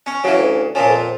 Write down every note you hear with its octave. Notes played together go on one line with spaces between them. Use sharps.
C#4
C#3 E3 F#3
D2
A#2 F3 C#4
F2